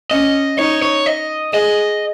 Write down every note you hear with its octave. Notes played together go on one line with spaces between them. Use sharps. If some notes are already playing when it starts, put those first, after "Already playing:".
C#4 D#5
D#4 C#5
C#5
D#5
G#4 D#5